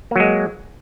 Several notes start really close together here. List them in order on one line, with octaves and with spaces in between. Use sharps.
A#3 F#3 G#3